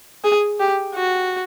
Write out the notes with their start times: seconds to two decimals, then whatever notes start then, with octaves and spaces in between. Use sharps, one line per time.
0.24 G#4
0.60 G4
0.95 F#4